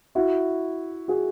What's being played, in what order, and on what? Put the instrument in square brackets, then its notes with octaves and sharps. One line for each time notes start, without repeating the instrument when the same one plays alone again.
[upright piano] E4 F#4
F#4 G#4